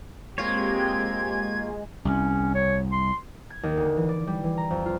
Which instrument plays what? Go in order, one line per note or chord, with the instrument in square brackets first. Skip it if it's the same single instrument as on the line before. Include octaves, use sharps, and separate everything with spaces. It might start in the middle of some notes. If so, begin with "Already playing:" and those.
[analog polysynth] G#3 [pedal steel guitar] A#3 F4 C#5 [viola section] C4 G4 [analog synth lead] G#6
[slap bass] C2 [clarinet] C#4
[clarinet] C#5
C6
[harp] G#6
D#2
D2
E3
D5
G3
E3
A#5
F2
F4